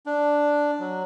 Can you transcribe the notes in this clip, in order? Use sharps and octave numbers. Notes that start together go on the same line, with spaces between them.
D4
F#3